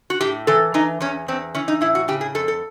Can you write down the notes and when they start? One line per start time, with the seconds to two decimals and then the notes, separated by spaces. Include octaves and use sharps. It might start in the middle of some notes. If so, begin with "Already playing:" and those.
0.10 F#4
0.21 A2 G4
0.47 E3 A4
0.74 E3 D#4
1.00 E2 C#4
1.28 E2 C4
1.55 E3 C#4
1.68 D#4
1.81 A2 E4
1.95 F#4
2.08 C#3 G4
2.21 G#4
2.35 F2 A4
2.48 A4